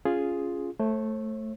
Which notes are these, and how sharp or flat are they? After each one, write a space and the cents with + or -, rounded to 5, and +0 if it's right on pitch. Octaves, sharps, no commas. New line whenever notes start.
C#4 +5 F4 +0 G#4 +0
A3 +0 C5 +45